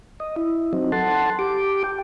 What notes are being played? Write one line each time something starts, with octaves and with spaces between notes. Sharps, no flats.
D#5
E4
F#3 C4 D#4
A4 F#5 A5 C6
G4 D6
G5